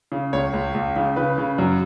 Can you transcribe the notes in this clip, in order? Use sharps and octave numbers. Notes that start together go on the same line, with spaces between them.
C#3
C#2 C#5
C#2
C#2
C#3
C#3 B4
C#3
F#2